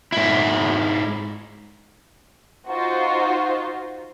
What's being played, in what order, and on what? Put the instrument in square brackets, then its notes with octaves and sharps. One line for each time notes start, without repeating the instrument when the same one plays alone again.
[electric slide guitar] G#2 E4
[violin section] D#4 F4 F#4 C5